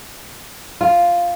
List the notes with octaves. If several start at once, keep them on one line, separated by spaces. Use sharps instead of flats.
F4